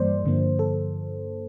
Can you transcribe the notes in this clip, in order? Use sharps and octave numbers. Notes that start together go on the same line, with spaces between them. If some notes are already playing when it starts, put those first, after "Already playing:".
Already playing: G2 E3 G3 A#3 C5 D5
G2 D3 F3 A#3
A4